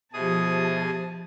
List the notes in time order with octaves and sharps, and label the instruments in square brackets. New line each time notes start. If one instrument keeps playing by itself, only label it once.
[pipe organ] B2 G#4 D#6 [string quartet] F3 A5 [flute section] G4 C5 E5